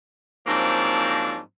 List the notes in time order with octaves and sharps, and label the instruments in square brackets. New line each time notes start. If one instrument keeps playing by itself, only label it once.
[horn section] G#2 F3 F#3 A#3 C4 D4